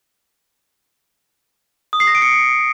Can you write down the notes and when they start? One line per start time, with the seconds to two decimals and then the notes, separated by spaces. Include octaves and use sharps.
1.93 D#6
2.00 C7
2.07 A#6
2.15 D7
2.22 C#7